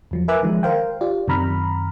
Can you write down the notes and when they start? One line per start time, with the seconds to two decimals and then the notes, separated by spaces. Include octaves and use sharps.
0.11 E2 F3 F#3
0.28 A#4 B4 E5 G#5 D6 F#6
0.43 D#3 F3 G#3
0.63 A#4 C5 F5 G5
1.01 F4 G4 D5
1.28 F#2 C3 D#3 A#5 B5 F6